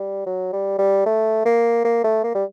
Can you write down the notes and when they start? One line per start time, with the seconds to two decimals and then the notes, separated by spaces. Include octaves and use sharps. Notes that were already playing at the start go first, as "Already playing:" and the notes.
Already playing: G3
0.26 F#3
0.53 G3
0.79 G3
1.06 A3
1.46 A#3
1.85 A#3
2.04 A3
2.24 A#3
2.35 G3